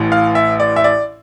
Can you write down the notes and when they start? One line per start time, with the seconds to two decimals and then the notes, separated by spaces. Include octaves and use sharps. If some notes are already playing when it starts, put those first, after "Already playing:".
Already playing: A1 A2 E3
0.12 F5
0.35 E5
0.60 D5
0.76 E5
0.84 D5